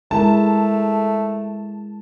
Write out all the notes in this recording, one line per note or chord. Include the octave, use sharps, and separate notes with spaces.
G#3 A3 E4 A#4 A5